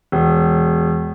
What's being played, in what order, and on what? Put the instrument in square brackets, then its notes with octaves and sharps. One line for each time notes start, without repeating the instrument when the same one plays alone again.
[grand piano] E1